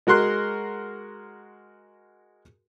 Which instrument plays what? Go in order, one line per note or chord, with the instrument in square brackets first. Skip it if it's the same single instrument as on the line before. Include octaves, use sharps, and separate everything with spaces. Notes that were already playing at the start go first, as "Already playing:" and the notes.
[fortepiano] G#3 F#4 A#4 C6 F#6